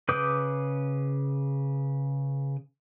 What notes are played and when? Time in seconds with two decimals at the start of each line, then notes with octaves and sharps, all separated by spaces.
0.09 C#3 B4 D6 D#6 G6